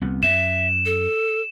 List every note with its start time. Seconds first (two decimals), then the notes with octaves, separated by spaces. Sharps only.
0.01 C2 B3
0.23 F#2 E5 E7
0.86 A4